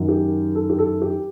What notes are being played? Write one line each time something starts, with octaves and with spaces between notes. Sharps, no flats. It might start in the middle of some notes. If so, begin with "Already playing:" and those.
Already playing: F#2 D#3 F#3
G4
A4
G4
A4
G4